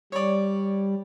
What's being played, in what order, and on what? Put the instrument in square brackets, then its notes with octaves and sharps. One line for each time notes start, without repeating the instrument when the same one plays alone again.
[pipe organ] G3 [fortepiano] C#5 D5